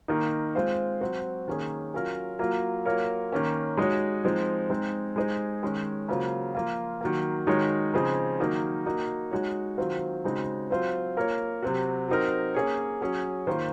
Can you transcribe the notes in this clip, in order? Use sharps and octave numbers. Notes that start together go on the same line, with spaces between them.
D#3 A#3 D#4
G#3 C4 F4 C5
F#3 C4 F#4
D#3 A#3 C#4 G#4
F#3 C#4 F4 A#4
F#3 A#3 F4 A#4
F#3 A#3 F4 A#4 C#5
D#3 A#3 C#4
G#3 D#4 F#4 C#5
F3 G#3 C4 D#4
G#3 C4 D#4
G#3 D#4 G#4 C5
D#3 G#3 C#4
C#3 F#3 A#3 F4 C5
F3 A#3 F4
D#3 F#3 A#3
D#3 G#3 D#4 F#4 C#5
C#3 F3 C4 D#4 G#4
D#3 F#3 A#3 D#4
A#3 D#4 F#4
G#3 D#4 F#4 C#5
D#3 F#3 C4 F4 C5
C#3 G#3 C4 D#4 F#4
F#3 C4 F4 C5
A#3 F4 A#4 C#5
C3 F#3 C4 F#4
F#3 C4 D#4 A#4
A#3 C#4 G#4 C#5
F#3 C#4 G#4
D#3 A#3 F4 C5